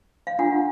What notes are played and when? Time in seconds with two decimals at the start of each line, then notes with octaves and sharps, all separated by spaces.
0.27 F5
0.39 D4 F4 A4 F#5